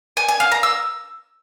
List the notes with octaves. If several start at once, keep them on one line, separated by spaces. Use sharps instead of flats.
G#5
G#5
F5
A#5
E6